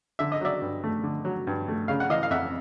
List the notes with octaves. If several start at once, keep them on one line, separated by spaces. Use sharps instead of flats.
D3 E5
D#5
F#3 D5 E5
G2
A3
D3
F#3
G2
A3
C#3 F5
F#5
E3 D#5 F5
F5
F2 E5 F#5